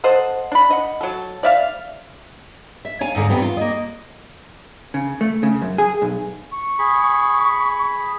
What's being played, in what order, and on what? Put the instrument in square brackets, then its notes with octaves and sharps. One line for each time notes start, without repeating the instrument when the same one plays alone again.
[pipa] A4 C5 D#5 F#5
D4 B5
D#5 F#5
F#3 A4
D5 E5 F5
[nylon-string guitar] E5
C#5 F5 G#5
D#2 G#2 D3 A#3
E2 C3 B3 C4
F4
A#3 D#5
[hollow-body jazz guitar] C#3
A3
C#3
F#2
G#4
B1
[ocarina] C#6
[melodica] G#4 B5